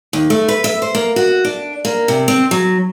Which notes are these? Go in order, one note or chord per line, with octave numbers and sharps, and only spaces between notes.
D#2
A3
B4
E5
C5
A#3
F#4
D4
A#3
C3
C4
F#3